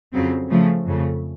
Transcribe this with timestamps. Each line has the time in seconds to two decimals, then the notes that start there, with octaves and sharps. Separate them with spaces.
0.12 F2 C#3 F#3 C4
0.50 C#3 F3 A3
0.87 F2 C#3 A3